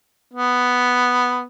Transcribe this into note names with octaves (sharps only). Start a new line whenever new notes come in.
B3